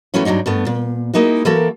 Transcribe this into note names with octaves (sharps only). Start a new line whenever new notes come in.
E3 F#3 A3 B3 C#4 E4
G2 B2 F#3 D4 D#4
G2 A3 B3
A#2
G#3 A#3 D#4 E4 F#4
E3 A#3 F#4 A4 A#4